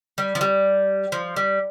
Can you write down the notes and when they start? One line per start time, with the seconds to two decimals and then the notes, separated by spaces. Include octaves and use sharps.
0.18 G3
0.35 F3
0.41 G3
1.12 F3
1.36 G3